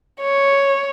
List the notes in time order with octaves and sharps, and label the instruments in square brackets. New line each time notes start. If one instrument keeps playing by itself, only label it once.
[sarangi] C#5